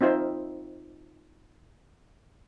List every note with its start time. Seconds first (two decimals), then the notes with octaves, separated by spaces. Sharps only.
0.01 C4 D#4 F4 C5 E5